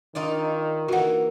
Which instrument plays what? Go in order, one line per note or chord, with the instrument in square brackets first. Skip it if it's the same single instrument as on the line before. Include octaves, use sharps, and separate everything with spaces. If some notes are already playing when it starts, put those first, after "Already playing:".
[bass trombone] D#3 [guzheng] D#4 F4 D5
[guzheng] E3 A#3 [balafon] F#4 F#5